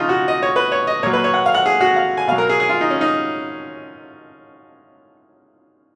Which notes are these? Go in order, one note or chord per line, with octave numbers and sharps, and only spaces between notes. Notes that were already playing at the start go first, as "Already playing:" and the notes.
Already playing: C#3 F3 D#4 F4
F#4
D#5
C#5
B4
C#5
D#5
A#2 F#3 C#5
B4
C#5
F#5
F5
F#5
G#4
F#4
F5
G#5
B2 F#3 F5
A#4
G#4
G#4
F4
D#4
C#4
D#4